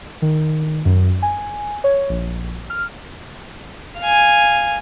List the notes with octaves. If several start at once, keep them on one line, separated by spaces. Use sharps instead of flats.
D#3
F#2
G#5
C#5
A#1
F6
F5 G#5